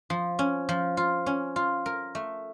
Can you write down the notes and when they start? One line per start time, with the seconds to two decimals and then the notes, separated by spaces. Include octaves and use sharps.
0.10 F3
0.39 C#4
0.69 F3
0.97 F4
1.26 C#4
1.56 F4
1.86 A#4
2.15 A3